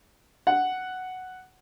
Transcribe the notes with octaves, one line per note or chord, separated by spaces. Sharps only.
F#5